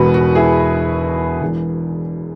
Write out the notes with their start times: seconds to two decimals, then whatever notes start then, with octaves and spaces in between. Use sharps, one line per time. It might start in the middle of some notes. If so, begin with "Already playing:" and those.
Already playing: E1 E2 B2 F#4 B4
0.14 F#4
0.35 E4 G#4
1.41 E1 E2 E3